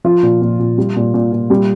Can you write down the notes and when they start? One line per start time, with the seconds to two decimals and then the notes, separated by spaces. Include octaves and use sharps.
0.04 F3 F4
0.23 A#2
0.41 A#2
0.59 A#2
0.78 G3
0.96 A#2
1.14 A#2
1.32 A#2
1.50 G3